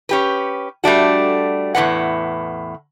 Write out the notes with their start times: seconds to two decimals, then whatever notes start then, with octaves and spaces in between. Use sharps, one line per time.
0.09 C#4 G4 B4
0.84 G3 A3 D4 F#4
1.75 E2 A2 D#3 B4 F#5